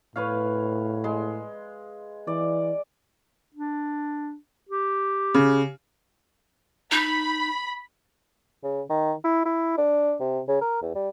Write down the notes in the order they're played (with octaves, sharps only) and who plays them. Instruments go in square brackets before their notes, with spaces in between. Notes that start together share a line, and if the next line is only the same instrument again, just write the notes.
[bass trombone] A2 [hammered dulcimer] B4 C#5 F5
[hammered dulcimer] G#3 C6
[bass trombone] E3 [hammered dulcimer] D5
[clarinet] D4
G4
[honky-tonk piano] C#3
[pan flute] D#4 [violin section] B5
[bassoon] C#3
D#3
E4
E4
D4
C3
C#3
A#4
E2
G3